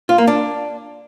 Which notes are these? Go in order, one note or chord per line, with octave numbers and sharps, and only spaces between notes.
F4
A#3
D4